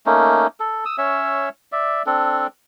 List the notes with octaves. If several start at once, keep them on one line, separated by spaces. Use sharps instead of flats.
A3 A#3 C#4 D#4
A4
D#6 E6
C#4 C#5 E5 E6
D5 E5
C4 D4 A4